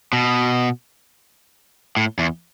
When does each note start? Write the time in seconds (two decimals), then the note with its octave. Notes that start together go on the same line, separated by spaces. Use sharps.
0.13 B2
1.97 A2
2.19 E2